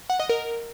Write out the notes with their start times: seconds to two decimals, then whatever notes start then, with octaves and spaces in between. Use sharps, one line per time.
0.10 F#5
0.20 D#5
0.29 A#4